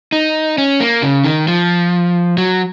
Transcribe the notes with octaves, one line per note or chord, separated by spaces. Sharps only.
D#4
C#4
A#3
C#3
D#3
F3
F#3